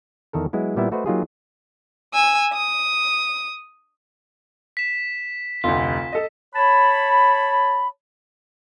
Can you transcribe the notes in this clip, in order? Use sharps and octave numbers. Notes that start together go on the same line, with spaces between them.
E2 D#3 A4 A#4
F#3 G#3 B3 E4
A#2 G3 B3 E4 E5
A3 F#4 B4 C5 D#5
F#3 A#3 D#4 F4 G4 G#4
G#5 E6
D#6
B6 E7
F1 D2 F4
A4 D#5
C#5 A5 B5